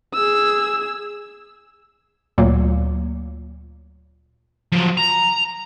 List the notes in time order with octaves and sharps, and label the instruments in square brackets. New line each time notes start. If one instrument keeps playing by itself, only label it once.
[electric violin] G#4 E6
[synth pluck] D2 A#2 F#3 A#3
[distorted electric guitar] F3 F#3
A#5